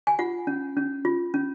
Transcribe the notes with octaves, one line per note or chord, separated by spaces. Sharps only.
G#5
F4 F#5
C#4
C#4
F4
C#4